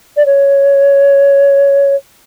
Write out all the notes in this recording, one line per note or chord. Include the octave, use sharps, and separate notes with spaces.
D5
C#5